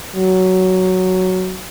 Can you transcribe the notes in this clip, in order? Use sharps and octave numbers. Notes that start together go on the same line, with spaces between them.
F#3